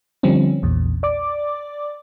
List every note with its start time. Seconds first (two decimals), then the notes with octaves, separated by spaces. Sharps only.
0.23 D3 F3 G3 C4 C#4
0.62 A#1 E2 A#2
1.03 D5 D6